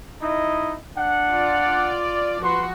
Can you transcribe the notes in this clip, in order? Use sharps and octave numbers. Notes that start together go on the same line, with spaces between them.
D#4 E4 D#5
D4 F#5
F4 D5
F3 F#4 B4 C6